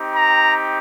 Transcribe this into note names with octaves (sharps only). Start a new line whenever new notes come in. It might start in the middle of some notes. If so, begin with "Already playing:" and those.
Already playing: C4 D#4 G4
A#5